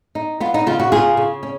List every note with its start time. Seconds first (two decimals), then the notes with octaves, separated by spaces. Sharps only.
0.15 D#4
0.40 B3 F4
0.54 D#4
0.66 C#3 F4
0.80 F#4
0.92 C#3 F4 G#4
1.17 C#3
1.43 C#4